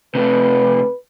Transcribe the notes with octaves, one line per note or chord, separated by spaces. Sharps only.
C3 A3 B4